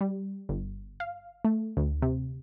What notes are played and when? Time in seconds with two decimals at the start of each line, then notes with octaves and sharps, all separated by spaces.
0.01 G3
0.49 G1
1.00 F5
1.45 A3
1.77 D2
2.02 C3